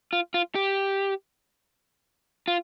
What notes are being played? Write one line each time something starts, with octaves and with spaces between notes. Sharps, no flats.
F4
F4
G4
F4